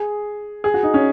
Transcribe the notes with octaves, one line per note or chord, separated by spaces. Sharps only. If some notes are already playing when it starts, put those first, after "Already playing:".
Already playing: G#4
G#4
F#4
D#4
C#4